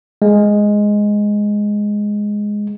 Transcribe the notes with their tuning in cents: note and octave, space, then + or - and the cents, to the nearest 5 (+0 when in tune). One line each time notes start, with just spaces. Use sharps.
G#3 +0